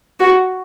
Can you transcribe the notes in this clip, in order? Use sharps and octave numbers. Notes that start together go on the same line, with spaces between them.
F#4